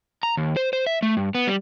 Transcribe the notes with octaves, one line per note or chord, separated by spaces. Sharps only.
A#5
D#2
C5
C5
E5
A3
G2
B3
G3